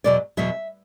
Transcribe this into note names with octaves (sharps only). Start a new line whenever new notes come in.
E2 B2 F#3 D5
E2 B2 F#3 E5